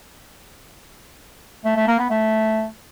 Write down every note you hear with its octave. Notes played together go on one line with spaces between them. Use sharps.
A3
A3
A#3
B3
A3